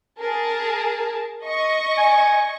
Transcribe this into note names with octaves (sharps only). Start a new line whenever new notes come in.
G#4 A#4 A5
D#5 C#6
G#5